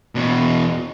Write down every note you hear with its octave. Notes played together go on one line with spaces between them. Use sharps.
E2 B2